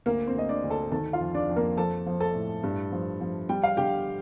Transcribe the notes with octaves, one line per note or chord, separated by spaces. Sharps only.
D2 A#3 A#4
C4 C5
D2 D#5
D4 D5
D2
A4 A5
D#3 A4 A5
F4 F5
F2
D4 D5
F2
A#3 A#4
F3 A4 A5
F3
A4 A5
A2
G2
F3
F3
G3 G5
F5
D3 G4 G5